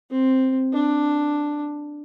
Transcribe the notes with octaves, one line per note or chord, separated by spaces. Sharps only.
C4
D4